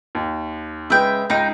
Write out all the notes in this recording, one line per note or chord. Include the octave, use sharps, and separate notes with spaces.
D#2
C#3 G#3 B4 E5 G5
C#2 D#4 G5